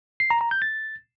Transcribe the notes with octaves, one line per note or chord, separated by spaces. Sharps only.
C7
A#5
A#5
G6
A6